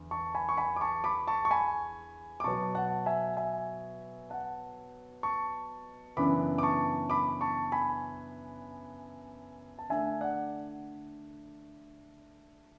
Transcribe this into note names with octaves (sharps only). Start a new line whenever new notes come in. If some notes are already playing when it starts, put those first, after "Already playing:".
Already playing: E2 D3
A5 C#6
G#5 B5
C#6
G#5 B5
D6
A5 C#6
B5 D6
A5 C#6
C#6
G#5 B5
D6
B2 F#3 B3 A5 C#6
F#5 A5
E5 G#5
E5 G#5
F#5 A5
A5 C#6
F#2 C#3 E3 B3 D4 B5 D6
D6
A5 C#6
B5 D6
A5 C#6
G#5 B5
A5
D3 A3 D4 E5 G#5
D5 F#5